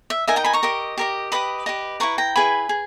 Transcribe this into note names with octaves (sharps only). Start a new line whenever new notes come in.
E5
D#4 A#4 D#5 E5 G#5
G5 A#5
G#5 B5
A#5 C#6
G4 A#4 D#5
G4 A#4 D#5
G4 B4 D#5 B5 D#6
G4 B4 D#5
E4 G#4 B4 A#5 C#6
G5 A#5
E4 G#4 B4 G#5 B5
G#4